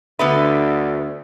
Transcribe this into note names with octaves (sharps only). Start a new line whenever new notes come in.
D2 D3 B3 B4 E5